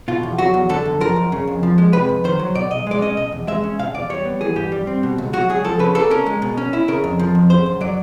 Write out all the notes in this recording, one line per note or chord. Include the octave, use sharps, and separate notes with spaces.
B2 F4
E2
F#3 F#4
E2
D3 A4
F#2
F3 A#4
F#2
C#3
F2
F3
G#3
C3 B4
F2
D#3 C5
F#3
B2 D5
B1 D#5
G#3 D5
C#4 D#5
B2 D#5
E2
G#3 E5
C#4
B2 F5
E2 D5
G3 C#5
B3
E3 G#4
G2 G4
G3
C4
B2
C#2
F#3 F#4
C#2 G#4
F3 A4
C#3 B4
A#3 A4
C#4 A#4
G#3
B2
C#4
E4
C#3 A#4
F2
F3
F2
C#3 C5
F#2
F#3 D5